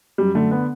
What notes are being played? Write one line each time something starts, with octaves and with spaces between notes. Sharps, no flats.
F#2 G3
D3 A3
B3